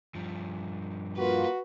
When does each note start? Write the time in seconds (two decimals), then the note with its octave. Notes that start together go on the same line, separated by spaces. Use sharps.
0.15 G2 F3
1.18 A#3 F4 F#4 B4